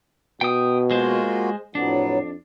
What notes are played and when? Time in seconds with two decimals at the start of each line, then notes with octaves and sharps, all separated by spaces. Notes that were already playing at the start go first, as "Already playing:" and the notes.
0.41 B2 G5 D#6
0.91 G#3 A#3 F4 F#4 C5
1.75 F2 A2 F#3 B3 D4